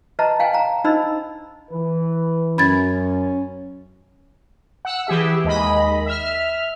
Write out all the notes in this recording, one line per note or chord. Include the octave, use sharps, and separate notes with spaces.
B4 D#5 E5 A5 A#5
E5 F5 G5 G#5
G5 A#5
D4 D#4 C5 D#5 B5 E6
E3 B4
F#2 C#4 B5 G#6 A6
F#5 E6
E3 G4 G#4 E5
D#2 G#3 D#5 B5
E5 F6